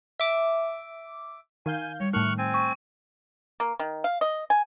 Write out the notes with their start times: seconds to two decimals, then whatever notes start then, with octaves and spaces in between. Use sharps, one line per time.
0.20 E5 D6
1.66 D#3 F5 G#5 G6
2.00 G3 C#5
2.13 A2 D#3 A3 C#6 F6 F#6
2.38 C4 G#5
2.54 C#6
3.60 A#3
3.79 D#3
4.04 F5
4.21 D#5
4.50 G#5